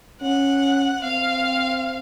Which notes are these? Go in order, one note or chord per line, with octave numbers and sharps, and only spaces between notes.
C#4 F#5
C4 F5